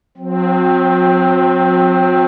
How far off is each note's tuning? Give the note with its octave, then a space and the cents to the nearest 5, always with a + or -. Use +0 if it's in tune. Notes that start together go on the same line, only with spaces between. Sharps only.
F#3 -45 C4 +0